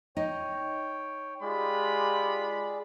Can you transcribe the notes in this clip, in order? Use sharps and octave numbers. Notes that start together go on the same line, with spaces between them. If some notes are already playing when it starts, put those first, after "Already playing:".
D#4 C#5 G5
G#3 F4 G4 G#4 D5 B5